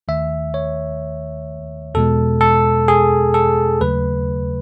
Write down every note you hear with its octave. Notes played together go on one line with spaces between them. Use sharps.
D#2 D#3 A3 E5
C#5
E2 B2 G#3 A4
A4
G#4
A4
D#2 C#3 F#3 A3 B4